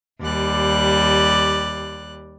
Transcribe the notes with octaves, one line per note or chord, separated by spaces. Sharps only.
D#2 G3 D5 F#6